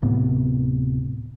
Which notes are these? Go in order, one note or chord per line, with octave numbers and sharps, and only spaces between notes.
D1 A2 C3 B3